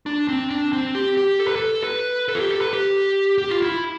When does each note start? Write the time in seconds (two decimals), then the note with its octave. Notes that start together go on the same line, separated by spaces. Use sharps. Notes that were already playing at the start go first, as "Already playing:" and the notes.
0.06 D4
0.28 C4
0.50 D4
0.73 C4
0.95 G4
1.17 G4
1.39 A4
1.47 B4
1.56 A4
1.84 B4
2.28 A4
2.35 F4
2.40 G4
2.51 A4
2.61 B4
2.73 G4
3.38 G4
3.50 F4
3.62 E4